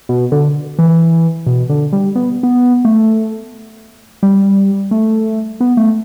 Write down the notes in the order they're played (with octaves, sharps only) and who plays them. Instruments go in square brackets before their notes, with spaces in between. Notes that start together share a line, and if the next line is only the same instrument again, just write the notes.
[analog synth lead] B2
D3
E3
B2
D3
G3
B3
B3
A3
G3
A3
B3
A3